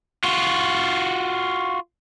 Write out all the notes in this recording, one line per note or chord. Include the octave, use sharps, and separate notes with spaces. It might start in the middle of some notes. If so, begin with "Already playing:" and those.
F4 F#4